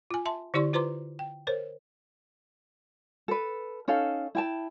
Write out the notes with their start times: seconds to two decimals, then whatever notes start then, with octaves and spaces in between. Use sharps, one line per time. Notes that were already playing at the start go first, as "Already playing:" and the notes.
0.11 F4 G#5
0.25 E5 A5 C6
0.54 D3 E4 G4 D5 C6 C#6
0.73 F4 B4 C5 A#5 C6 D6
1.19 G5
1.47 A#4 C5 C#5
3.28 A4 B4
3.88 C#4 D#4 A4 F5
4.35 E4 G5 A5